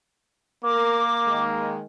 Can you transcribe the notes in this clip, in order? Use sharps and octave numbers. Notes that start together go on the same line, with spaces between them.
A#3 A#4 D6
D#3 G#3